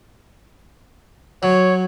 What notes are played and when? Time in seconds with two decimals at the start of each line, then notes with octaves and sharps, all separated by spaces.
1.43 F#3 C#5